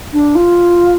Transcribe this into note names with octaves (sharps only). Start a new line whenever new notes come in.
D4
F4